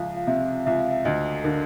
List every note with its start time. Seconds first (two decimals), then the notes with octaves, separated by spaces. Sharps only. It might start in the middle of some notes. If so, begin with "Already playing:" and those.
Already playing: C#2 F3 E5 F5
0.17 F5
0.27 C3 E5
0.66 C#2 E5
0.79 F5
0.91 E5
1.05 D2 D#5
1.44 D3 A#4